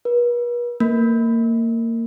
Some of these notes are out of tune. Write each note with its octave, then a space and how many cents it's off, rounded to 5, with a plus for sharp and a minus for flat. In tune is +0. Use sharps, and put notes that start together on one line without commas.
B4 -45
A#3 -25